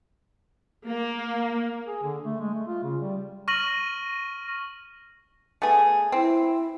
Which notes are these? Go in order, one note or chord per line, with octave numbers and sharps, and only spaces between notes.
A#3
G#4
D3
A3
G#3
A3
F4
C#3
G3
C#6 F6 A#6 D#7 F#7
A3 B3 G#4
C4 E4